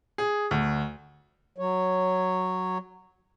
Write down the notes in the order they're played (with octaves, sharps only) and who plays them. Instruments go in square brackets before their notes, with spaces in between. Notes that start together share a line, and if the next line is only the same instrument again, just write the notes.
[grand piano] G#4
D2
[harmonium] F#3 C#5